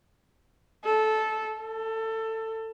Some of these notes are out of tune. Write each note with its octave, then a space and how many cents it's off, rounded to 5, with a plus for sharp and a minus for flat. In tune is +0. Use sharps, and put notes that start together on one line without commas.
A4 -15
A4 +20